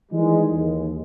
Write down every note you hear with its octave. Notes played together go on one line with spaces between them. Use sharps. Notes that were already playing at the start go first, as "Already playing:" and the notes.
D#3 E3 G3 G#3
D#2